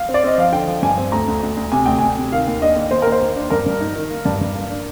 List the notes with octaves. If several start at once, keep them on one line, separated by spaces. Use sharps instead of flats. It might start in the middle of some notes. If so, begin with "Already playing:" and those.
Already playing: F5
C4
D5
C4 D#5
F3 F5
D3 G5
F3
G2 G#5
C4
D2 A#5
D2
D2
D2
C3 G#5
D2 G5
D2 G#5
C3
D#3 F5
D#2
D4 D#5
D#2
D#2 C5
D#2 A#4
C5
D#2
D4
G2 A#4
G2
D#4
D#3
A#3
G2
G2
A#3
D4